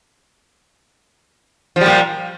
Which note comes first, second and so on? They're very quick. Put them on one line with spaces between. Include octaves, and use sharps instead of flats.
F3 G3 A#2